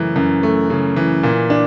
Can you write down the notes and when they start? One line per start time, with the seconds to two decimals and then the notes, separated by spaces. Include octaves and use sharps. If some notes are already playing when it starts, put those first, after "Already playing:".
Already playing: F#2 C#3 E3 A3
0.16 F#2
0.43 A3
0.70 C#3
0.96 E3
1.23 A#2
1.50 D4